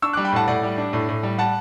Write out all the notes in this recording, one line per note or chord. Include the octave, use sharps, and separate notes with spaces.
D4 C#6 E6
D6 F#6
G3
G5 B5
A2 F#5 A5
A2 D5 F#5
G3
D4
A2
A2
G3
G3 F#5 A5